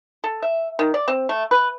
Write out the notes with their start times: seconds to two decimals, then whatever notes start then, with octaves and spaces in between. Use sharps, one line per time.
0.24 A4
0.42 E5
0.79 D#3
0.94 D5
1.08 C4
1.29 A3
1.51 B4